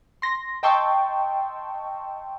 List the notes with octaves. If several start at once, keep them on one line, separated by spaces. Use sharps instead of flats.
C6 A#6
D#5 G5 A5 C6 C#6 E6